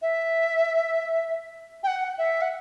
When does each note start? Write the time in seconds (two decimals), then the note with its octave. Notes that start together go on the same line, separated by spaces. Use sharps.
0.02 E5
1.83 G5
1.87 F#5
2.18 E5
2.42 F#5